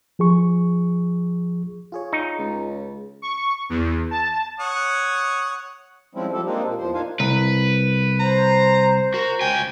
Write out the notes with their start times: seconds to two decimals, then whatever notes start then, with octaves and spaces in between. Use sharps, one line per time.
0.19 F3 G#4 C#6
1.92 F4 G#4 C#5
2.13 D#4
2.38 C#2
3.22 C#6
3.70 E2
4.11 A5
4.60 C#5 F#5 D#6
6.15 F3 G3 G#3 C4 C#4 E4
6.33 F3 G3 G4 A4
6.46 G#3 A#3 C4 D4 D#4 G4
6.66 A#2 G3
6.78 E2 F3 C5
6.94 A#2 D4 D#4 C5 F5 G#5
7.20 C2 B4
8.20 C5 A#5
9.14 F#4 A#4
9.41 C#2 G5 G#5